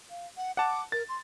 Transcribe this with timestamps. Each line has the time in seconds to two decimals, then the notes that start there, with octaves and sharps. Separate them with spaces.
0.10 F5
0.37 F#5
0.57 F#5 A5 D6
0.92 A#4 A6
1.09 C6